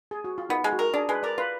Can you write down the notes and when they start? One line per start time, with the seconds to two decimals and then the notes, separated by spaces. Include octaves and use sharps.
0.11 G#4
0.24 F#4
0.38 F4
0.49 B3 D#4
0.64 G#3
0.73 F#4
0.79 A#4
0.94 D4 G#4
1.09 G#3 B4
1.23 A#4 D5
1.38 F4 B4